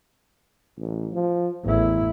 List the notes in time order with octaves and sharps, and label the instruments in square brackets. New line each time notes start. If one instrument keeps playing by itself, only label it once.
[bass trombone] A1
F3
[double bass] A1 E4 [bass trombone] E2